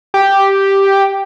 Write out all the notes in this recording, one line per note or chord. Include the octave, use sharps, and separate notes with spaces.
G4